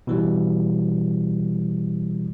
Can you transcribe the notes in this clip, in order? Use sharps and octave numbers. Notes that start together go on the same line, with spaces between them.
B2 E3 G3